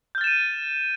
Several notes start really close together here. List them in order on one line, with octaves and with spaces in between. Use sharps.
G6 F6 A6 E7 D#7